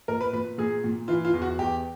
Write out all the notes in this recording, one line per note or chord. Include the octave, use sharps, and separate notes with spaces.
A#2 A#4
B4
A#2 B4
A#2 G#4
A#2
E3 F4
F4
E2
F#4
E2 G4